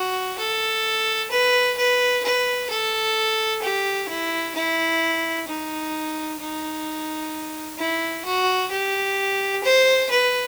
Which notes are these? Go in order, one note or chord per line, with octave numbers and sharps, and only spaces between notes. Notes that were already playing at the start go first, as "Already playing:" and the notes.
Already playing: F#4
A4
B4
B4
B4
A4
G4
E4
E4
D#4
D#4
E4
F#4
G4
C5
B4